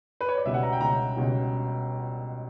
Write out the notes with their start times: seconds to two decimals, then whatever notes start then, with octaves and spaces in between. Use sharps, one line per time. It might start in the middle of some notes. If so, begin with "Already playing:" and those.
0.21 B4
0.28 C#5
0.38 D5
0.45 C#2 B2 G3 C#4 E5
0.54 F#5
0.63 A#5
0.72 G5
0.81 C#2 B2 G3 C#4 A#5
1.16 C#2 B2 G3 C#4